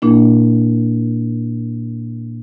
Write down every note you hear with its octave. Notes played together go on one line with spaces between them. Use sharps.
A#2 A#3 D4 E4